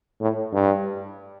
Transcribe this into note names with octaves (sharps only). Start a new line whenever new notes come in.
A2
G2